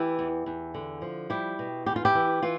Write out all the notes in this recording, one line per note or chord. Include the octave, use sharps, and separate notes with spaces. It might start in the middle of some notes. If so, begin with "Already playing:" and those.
Already playing: E3 E4 G4
E2
E2
D3
F3
G3 E4 G4
B2
E2 G4
F4
E4 G4
E3
E3 F4